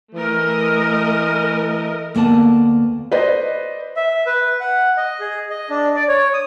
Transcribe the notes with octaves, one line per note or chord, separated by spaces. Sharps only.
E3 A3 A#4 D#5
D2 A#3 B3 D5 A5
B4 C5 D5 D#5
E5
B4
F#5
D#5
G#4
D#5
D4
D5
C#5
D#6